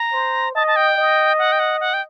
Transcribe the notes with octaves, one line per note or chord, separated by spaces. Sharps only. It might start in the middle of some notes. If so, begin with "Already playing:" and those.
Already playing: A#5
C5
D#5 A5
A5
G5
D#5
F#5
G5
F#5
F#5
G5